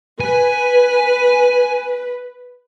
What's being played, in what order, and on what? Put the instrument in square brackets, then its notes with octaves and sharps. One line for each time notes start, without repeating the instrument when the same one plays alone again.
[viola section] B4 [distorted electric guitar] G#5